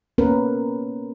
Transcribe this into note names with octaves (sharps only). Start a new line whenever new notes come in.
A#3 B3 C#4 A#4 B4